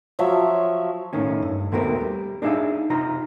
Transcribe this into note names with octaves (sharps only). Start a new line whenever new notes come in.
F3 F#3 C#5 E5
B1 A2 D#3 C#4
G2
D#2 B2 A3 C4 G4 A#4
G3
D4 D#4 G#4 E5 F5
C3 D#4 F4 A#5